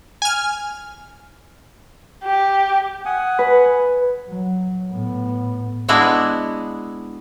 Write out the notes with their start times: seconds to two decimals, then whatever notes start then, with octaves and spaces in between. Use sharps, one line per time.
0.22 G#5 F6
2.24 G4
3.05 F#5 G#5 D#6
3.39 B4
4.29 F#3
4.91 A2 B3
5.88 G#3 B3 D4 E4 F#4 G#4